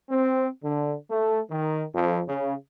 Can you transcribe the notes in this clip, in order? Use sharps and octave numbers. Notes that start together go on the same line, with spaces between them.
C4
D3
A3
D#3
F2
C#3